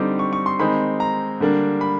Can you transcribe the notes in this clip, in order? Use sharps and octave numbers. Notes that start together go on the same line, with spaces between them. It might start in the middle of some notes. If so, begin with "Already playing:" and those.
Already playing: D3 G3 C4 D#4 D6
C#6
C#6
C6
D#3 G#3 C4 D#4 B5
A#5
D3 G3 A#3 D4
B5